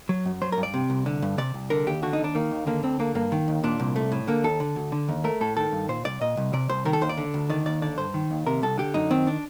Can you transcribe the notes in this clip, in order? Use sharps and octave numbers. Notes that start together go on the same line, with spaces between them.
F#3
F#2
F#3 C5
A#4
G2
D5
C3
C2
D3
G2
C3 D5
C2
D3 A#4
D#2 G4
D3 F#4
D#4
D#2
D4
D#3 A#3
D#2
D3 A#3
D2 C4
D3 A#3
G2 A#3
D#3
D#2
A#2 D4
C2
A3
A2
D3 A#3
D#2 A4
D3
D2
D3
D#2
A3 A#4
A2 A4
D#3 A4
G2
A#2 C5
C2 D5
A#2 D#5
C2
C3 D5
C2 C5
D#3 A#4
A4
D#2 C5
D5
D3
D2
D#3 D5
D#2 D5
D3 D5
G2 C5
D#3
D#2
C3 A#4
C2 A4
D3 G4
F#2 D#4
D#3 C4
D4